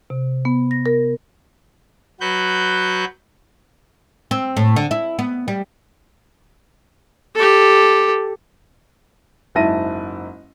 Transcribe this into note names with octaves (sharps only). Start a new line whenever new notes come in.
C3
B3
A#6
A#4
F#3 F#4 B4 F#6 G6
C4
A2
D3
E4
B3
G3
G4 A4
F#1 G#2 E4 A5 A#6 D#7